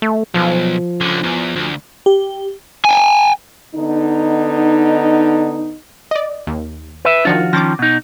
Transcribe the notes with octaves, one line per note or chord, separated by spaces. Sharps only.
A3
B1 F3
C#2 D3
E2
D2
G4
G5 G#5
D3 B3 D#4
D5 D#5
D#2
B4 E5
D#3 F3 D4 F4 F#4
D#3 F3 C#4 D6 A6 A#6
B2 D#4